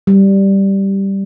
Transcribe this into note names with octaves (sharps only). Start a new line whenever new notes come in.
G3